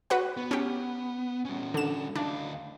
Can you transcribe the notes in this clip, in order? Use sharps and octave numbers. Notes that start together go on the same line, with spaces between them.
F#4 B4 F#5
B3
C#4 G4
G3 C#4
D3 E7
D2 D4 F5